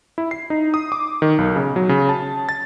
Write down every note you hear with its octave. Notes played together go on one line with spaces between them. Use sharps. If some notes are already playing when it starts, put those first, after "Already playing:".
E4
C7
D#4
D#6
D6
D#3
B1
C#3
F#3
C#3
A5
A6